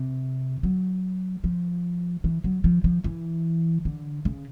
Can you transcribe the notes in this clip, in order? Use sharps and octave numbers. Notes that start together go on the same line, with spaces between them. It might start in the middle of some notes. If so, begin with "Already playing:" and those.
Already playing: C3
F#3
F3
E3
F#3
F3
F3
E3
D3
C#3